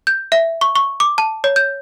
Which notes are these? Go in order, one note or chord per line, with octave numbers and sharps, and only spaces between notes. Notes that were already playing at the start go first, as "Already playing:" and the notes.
G6
E5
C#6
C#6
D6
A5
C#5
G6